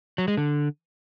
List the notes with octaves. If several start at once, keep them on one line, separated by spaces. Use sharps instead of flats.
F#3
G#3
D3